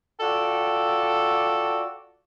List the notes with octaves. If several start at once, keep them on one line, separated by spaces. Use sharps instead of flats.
F4 F#4 A4 D5 G5